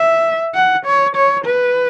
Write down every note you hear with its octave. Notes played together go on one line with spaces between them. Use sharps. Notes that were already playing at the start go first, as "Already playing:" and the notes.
Already playing: E5
F#5
C#5
C#5
B4